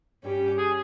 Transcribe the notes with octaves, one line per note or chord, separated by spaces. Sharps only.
G2 G3 C#4 G4
G#4